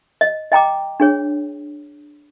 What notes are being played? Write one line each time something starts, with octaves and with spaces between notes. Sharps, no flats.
D#5
D#5 G5 A#5 D6
D4 G#4 C#5